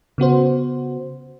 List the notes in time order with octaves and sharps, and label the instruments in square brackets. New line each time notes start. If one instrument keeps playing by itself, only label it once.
[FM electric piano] C#3 B3 F#4 C5